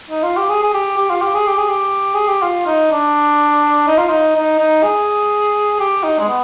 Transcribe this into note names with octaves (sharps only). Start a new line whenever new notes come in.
D#4
F4
G4
G#4
G#4
G4
G4
F4
G4
G#4
G4
G#4
G4
G#4
G4
F4
D#4
D4
D#4
F4
D#4
D#4
D#4
G#4
G4
D#4
G#3
B3